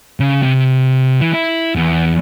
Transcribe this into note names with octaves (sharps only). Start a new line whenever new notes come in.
C#3
C3
E3
E4
E2